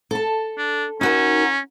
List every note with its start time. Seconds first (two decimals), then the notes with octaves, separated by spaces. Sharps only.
0.11 A4 A5
0.58 D4
1.01 C#4 D#4 F#4 A#4